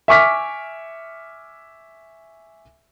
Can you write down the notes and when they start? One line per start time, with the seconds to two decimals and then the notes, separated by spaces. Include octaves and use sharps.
0.08 E5 G#5 C#6 D6 F6 B6